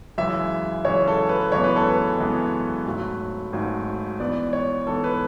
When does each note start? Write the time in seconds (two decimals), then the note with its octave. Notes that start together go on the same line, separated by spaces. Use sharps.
0.18 F#2 C#3 E3 G#3 E5
0.85 F#2 C#3 E3 G#3 C#5
1.08 A4
1.29 B4
1.52 F#2 C#3 E3 G#3 B3 C#5
1.64 B4
1.76 A4
1.89 B4
2.18 F#2 C#3 E3 G#3 B3
2.86 G#1 G#2 F#3 A3
3.53 G#1 G#2 F#3 A3
4.20 G#2 E3 B3 D5
4.53 C#5
4.87 G#2 E3 B3 A4
5.04 B4